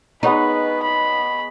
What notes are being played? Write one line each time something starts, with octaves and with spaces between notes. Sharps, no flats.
G#3 B3 D#4 B4 C#5
B5